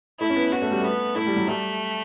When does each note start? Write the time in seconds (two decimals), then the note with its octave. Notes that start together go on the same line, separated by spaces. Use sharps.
0.20 A3 E4
0.30 C#4
0.36 B3
0.52 B3 F#4
0.62 A3
0.71 G3
0.81 A3 B3
1.16 A3 E4
1.26 G3
1.36 F#3
1.48 G3 A3